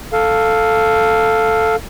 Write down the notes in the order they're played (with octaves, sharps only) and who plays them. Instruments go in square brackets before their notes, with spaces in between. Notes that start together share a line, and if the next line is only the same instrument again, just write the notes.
[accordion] A4 F5